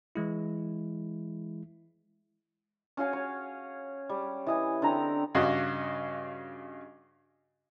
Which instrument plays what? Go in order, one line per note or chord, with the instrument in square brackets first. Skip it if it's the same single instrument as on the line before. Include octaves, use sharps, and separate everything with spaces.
[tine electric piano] E3 G#3 E4
[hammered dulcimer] C#4 F#4 F5 G#5
C#5
G3
E3 D#5 G#5
D3 C4 G5 A#5
[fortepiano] G2 C#3 F#4 D#5